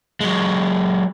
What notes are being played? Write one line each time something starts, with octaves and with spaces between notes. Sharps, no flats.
F#3 G#3